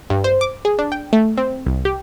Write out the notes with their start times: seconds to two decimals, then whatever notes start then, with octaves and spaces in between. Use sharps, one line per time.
0.10 G2
0.24 C5
0.41 D6
0.65 G#4
0.79 D4
0.92 G5
1.13 A3
1.37 C4
1.67 C2
1.85 G4